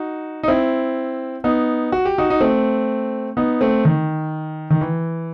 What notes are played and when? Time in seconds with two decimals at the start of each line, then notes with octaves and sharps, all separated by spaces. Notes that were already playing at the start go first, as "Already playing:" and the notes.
Already playing: D#4 F#4
0.43 D#4
0.48 C4 E4
1.44 B3 D#4
1.92 F#4
2.05 G4
2.18 D#4 F#4
2.30 D#4
2.40 A3 C4
3.37 B3 D#4
3.61 A3 C4
3.85 D#3
4.70 D#3
4.81 E3